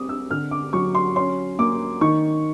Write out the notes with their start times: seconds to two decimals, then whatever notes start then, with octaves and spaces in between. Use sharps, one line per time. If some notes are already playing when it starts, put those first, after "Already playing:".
Already playing: G3 C4 D6 D#6
0.09 E6
0.31 D3 F6
0.51 D6
0.73 F#3 C#6
0.95 C6
1.16 C#4 C6
1.59 A#3 D6
2.01 D#3 C#6